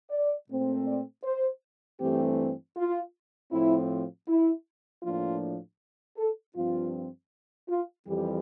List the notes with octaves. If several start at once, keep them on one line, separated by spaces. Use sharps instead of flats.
D5
A#2 A3 C4
D5
C5
G2 E3 A3 C4 G4
F4
A2 F3 C4 E4
E4
A2 F3 A#3 D4 F4
A4
G2 F3 C4 F4
F4
F2 E3 G3 G4